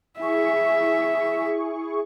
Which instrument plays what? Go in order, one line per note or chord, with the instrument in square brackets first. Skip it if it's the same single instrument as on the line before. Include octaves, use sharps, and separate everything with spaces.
[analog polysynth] E4 G#4 C#6 [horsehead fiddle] E5